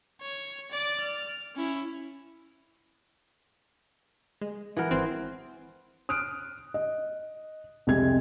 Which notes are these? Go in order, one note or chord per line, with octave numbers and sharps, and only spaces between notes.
C#5
D5 D6
F6
C#4 E4
G#3
E3 B3 A#4
G#1 C4
D#6 F6 F#6 D7
D#5
C2 F2 G#3 G#6